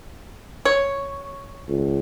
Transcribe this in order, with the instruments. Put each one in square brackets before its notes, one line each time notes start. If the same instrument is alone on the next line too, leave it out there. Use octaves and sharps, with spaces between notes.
[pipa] C#5
[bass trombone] C#2